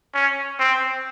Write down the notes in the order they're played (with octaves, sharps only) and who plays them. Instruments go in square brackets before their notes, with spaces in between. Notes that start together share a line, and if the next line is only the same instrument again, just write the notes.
[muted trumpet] C#4
C4